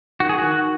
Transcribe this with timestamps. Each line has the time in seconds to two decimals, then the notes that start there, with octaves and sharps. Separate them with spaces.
0.20 D#3 F#4
0.29 G#4
0.38 D#3 F#4